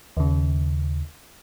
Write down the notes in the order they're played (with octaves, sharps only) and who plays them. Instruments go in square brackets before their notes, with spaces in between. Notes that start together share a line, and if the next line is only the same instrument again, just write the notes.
[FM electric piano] D#2 C#3